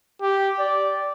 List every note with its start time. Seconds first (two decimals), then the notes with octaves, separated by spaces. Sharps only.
0.22 G4
0.59 D5